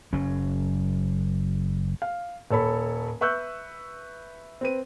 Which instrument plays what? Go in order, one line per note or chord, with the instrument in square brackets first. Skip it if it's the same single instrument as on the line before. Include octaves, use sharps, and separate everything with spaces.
[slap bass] F#1 F#3 C#4
[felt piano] F5
D#1 A4 C#5 B5
B4 E5 C#6 E6 F#6 G6
C4 B4 D#7